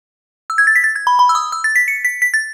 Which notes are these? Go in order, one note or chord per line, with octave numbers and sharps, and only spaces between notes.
E6
G#6
A6
B6
A6
G#6
B5
B5
E6
D#6
E6
A6
B6
C#7
B6
B6
A6